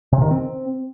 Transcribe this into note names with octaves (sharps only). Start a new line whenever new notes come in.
C3
D#3
C4